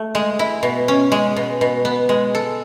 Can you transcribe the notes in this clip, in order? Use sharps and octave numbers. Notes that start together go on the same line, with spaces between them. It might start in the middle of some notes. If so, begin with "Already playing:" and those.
Already playing: A3
G#3
E4
B2
C#4
G#3
B2
B2
B3
G#3
A4